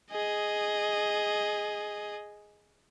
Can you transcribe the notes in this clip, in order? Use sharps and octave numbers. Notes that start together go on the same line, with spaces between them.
G#4 D#5